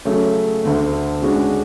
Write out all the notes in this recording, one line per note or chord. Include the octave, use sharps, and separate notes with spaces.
C#3 F#3 A3
D2 D3 A3
C#3 G#3 D4 F#4